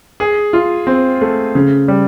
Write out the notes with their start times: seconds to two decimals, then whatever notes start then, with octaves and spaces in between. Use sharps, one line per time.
0.20 G#4
0.53 F4
0.87 C4
1.22 A3
1.55 C#3
1.88 G3